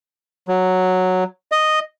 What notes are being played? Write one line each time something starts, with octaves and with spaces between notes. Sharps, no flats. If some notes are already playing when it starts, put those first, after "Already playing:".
F#3
D#5